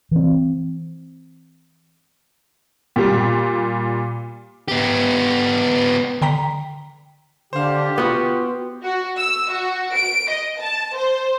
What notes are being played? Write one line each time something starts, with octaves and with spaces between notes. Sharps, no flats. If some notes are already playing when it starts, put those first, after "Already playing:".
E3 C4
A#2 G3
B3 G4
D3 G5 A#5 B6
D3 G4 C5 F5
B3 F4 F#4
F#4
E6
F#4
D7
D#5
A5
C5